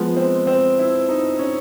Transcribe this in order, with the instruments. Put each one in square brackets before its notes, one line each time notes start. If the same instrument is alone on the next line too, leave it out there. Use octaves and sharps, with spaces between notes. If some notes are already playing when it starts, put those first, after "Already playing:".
Already playing: [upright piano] F3 G#3 B3
[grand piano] C4
C4
E4
D#4
C#4